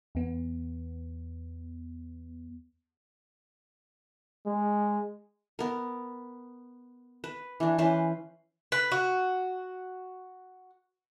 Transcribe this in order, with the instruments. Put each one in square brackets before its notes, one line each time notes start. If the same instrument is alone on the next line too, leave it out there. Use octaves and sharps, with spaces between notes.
[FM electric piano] E2 B3
[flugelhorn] G#3
[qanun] B3 A#4
B4
E3 D4
E3 C#4 B4 C5
[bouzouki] B4
F#4